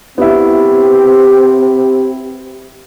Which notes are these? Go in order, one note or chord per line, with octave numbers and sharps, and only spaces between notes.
B3 C4 E4 G4